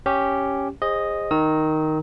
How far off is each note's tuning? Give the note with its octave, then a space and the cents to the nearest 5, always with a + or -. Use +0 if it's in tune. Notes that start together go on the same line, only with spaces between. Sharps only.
C#4 +0 G4 +0
G#4 -30 C5 +25 D#5 +0
D#3 +0 A#5 +0 E6 -45